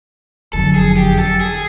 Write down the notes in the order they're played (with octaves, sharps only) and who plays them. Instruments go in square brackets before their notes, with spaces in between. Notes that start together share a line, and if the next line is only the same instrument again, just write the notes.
[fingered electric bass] F#1 F2 D3 F#3 [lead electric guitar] A4
[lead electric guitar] G#4
G4
A4
G#4